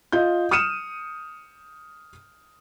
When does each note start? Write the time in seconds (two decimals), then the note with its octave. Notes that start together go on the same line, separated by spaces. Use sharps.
0.12 F4 D#5 G6
0.51 D#6 F6 C#7 D#7 E7